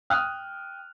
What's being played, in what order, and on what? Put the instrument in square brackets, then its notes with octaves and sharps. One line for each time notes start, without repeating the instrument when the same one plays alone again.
[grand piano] G5 D#6 F6 F#6